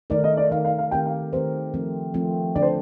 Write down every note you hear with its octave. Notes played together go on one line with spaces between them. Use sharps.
D#3 A3 D#4 A#4 D5
D#5
D5
D#3 A3 D#4 A#4 F5
F5
F5
D#3 A3 C4 G4 A#4 G5
F5
D#3 A3 C4 G4 A#4 C5
F3 A3 C4
F3 A3 C4
D3 A3 D4 D5
C5